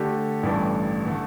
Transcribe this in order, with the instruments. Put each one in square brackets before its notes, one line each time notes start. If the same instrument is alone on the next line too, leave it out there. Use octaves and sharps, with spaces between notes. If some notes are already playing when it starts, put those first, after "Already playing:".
Already playing: [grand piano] D3 A3 G4
A1 G2 E3 A3 D4
D3 A3